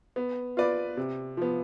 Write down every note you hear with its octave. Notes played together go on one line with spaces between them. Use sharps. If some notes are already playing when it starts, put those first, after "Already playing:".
B3
F4 B4 D5
C3
F3 B3